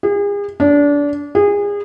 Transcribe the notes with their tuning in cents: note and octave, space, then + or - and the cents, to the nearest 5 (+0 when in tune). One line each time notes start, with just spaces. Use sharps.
G#4 -40
D4 -25
G#4 -30